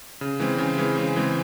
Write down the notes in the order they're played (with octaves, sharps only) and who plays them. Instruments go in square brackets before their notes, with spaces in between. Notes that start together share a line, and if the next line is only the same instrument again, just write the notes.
[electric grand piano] C#3
E3 G#3 C4
C#3
E3 G#3 C4
C#3
E3 G#3 C4